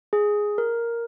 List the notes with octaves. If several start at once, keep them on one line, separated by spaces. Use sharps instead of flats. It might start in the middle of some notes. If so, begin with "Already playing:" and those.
G#4
A#4